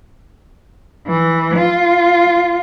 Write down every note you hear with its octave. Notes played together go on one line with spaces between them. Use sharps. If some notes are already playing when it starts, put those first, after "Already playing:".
E3
F4